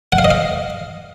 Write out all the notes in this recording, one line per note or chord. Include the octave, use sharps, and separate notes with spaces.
F#5
F5
D#5
F5